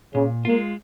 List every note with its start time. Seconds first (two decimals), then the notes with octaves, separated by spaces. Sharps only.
0.15 A#2 C#3
0.45 G#3 A#3 F4